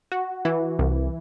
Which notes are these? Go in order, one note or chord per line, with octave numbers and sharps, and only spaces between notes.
F#4
E3
C2